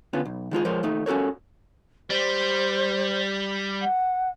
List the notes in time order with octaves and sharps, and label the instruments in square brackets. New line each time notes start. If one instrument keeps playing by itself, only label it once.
[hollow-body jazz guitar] D3 B3 C#4 F4
B1
D#3 G#3 F4 G#4
F3 G#3 A#4 C5 C#5
D#2 A3 D#4
C#4 F#4 A4 A#4 C#5
[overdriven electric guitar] G3 [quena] C5
[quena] F#5